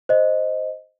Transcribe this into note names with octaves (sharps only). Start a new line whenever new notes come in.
C5 D#5